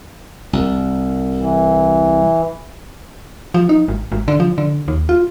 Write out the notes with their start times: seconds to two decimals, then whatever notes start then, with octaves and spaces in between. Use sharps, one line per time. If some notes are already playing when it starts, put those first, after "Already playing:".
0.53 C2
1.39 E3
3.54 F3
3.69 D#4
3.88 G#1
4.12 G#1
4.28 D3
4.40 F3
4.58 D3
4.88 D#2
5.09 F4